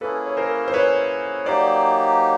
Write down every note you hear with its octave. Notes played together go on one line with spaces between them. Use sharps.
A#3 C#4 E4 G#4 A4 B4
C#5
A#4 C5
C5
B4 C#5
F#3 A#3 D#4 G4 C5 D5